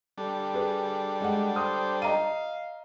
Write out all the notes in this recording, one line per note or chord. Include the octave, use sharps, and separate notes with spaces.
G3 D4 A4
G#4 B4
G#3 F#5
C5 D#6
D#5 F5 A#5 D#7